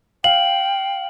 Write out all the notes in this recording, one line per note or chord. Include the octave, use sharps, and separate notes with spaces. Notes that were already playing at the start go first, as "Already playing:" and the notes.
F5 G5 F#7